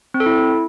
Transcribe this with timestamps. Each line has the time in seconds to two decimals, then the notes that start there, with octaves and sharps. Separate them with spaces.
0.14 C4
0.20 A4
0.26 E4